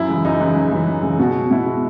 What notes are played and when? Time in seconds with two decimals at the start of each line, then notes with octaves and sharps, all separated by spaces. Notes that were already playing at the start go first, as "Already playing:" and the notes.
Already playing: F#2 E4
0.08 C#3 E3 G#3
0.25 F#2 D#4
0.40 C#3 E3 G#3
0.55 F#2
0.72 C#3 E3 G#3
0.87 F#2
1.03 C#3 E3 G#3
1.19 B2 F#4
1.34 G#3
1.50 B2 E4
1.66 G#3